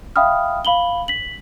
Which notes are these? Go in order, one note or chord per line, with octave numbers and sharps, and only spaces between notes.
E5 F5 G5 B5 D#6 F6
F5 B5 F#7 G7
B6 F#7